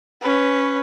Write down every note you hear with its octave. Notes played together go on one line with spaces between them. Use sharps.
C#4 B4